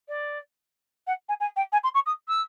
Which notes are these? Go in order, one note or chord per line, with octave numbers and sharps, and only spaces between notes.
D5
F#5
G#5
G#5
G5
G#5
C6
C#6
D#6
E6